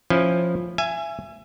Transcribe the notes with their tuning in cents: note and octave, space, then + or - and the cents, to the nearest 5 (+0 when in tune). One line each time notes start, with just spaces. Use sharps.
F3 +0 C#4 -10 E4 -5
E5 +30 G#5 +0